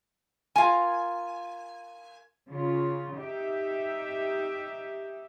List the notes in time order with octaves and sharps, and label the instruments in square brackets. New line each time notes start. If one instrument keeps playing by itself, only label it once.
[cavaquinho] F4 A#4 [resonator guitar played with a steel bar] G#5
[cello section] C#3 F4
D#4 G4 E5